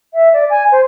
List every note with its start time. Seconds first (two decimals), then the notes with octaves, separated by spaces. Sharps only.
0.14 E5
0.33 D5
0.50 G#5
0.72 C5